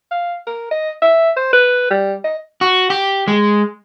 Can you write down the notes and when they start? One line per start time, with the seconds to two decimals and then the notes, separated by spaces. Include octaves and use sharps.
0.11 F5
0.47 A#4
0.71 D#5
1.02 E5
1.37 C5
1.53 B4
1.90 G3
2.24 D#5
2.61 F#4
2.90 G4
3.28 G#3